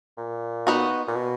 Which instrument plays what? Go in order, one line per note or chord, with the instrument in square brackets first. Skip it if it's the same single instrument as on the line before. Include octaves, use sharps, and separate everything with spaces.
[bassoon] A#2
[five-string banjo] B3 D#4 F#4
[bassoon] A#2
B2